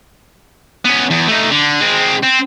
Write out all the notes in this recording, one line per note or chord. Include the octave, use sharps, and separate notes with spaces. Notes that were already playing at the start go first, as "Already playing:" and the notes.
B3 C#4
E2
A3 D#4
D3
G#3 C4
C4